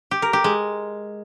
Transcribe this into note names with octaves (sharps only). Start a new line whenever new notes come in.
G4
A#4
G4
G#3